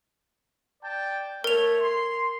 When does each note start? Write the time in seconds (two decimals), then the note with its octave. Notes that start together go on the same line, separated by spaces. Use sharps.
0.83 D5 G5 A5
1.44 A3 A#4 C#5 F7
1.81 C6